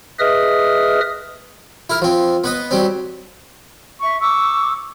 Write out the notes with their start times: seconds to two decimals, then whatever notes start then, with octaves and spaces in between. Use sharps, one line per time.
0.19 G#4 B4 D#5 E5 D#6 F6
1.90 E4 A#4
2.02 F3 C4
2.44 B3 B4 D#5
2.71 F#3 G3 C4
4.01 E5 C#6
4.21 C#6 D6 E6